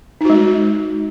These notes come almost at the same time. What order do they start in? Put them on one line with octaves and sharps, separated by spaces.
D#4 F#4 G#3